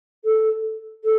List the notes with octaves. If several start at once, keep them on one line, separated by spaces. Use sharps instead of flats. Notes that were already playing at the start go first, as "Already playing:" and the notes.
A4
A4